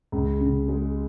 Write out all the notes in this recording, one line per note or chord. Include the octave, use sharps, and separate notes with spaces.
C#2
C#3
G#3